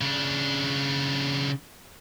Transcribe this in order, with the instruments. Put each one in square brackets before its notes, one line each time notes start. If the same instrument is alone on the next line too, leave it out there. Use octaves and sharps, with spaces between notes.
[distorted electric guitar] C#3 D4